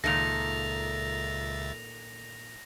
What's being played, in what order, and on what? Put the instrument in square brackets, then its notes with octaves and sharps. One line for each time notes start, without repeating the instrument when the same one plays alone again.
[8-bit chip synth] C#2 E5 A6 [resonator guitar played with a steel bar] A#2 D#3 A4 [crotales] A#6 F7